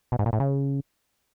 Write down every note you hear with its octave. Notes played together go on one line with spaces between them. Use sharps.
B2
G#2
A#2
A2
C#3